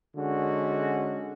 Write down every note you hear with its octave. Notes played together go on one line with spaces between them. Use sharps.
D3 G#3 C#4 F#4